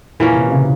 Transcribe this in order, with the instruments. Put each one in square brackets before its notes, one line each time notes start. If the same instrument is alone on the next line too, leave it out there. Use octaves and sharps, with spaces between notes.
[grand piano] A#2 [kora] E3 A#3 C#4
[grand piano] C3
C3
C#3